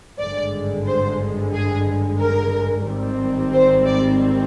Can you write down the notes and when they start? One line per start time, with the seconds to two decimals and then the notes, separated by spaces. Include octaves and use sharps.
0.20 G#1 G2 D3 G#3 D5
0.86 C5
1.53 G#4
2.19 A#4
2.85 G#1 G#2 D#3 G3 C4
3.53 C5
3.86 D5